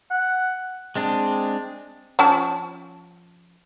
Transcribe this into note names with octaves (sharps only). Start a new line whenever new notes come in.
F#5
G#3 C4 D4
F3 C#4 A5